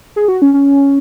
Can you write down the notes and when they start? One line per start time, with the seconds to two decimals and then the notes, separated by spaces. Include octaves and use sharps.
0.16 G#4
0.28 F#4
0.42 C#4
0.54 C#4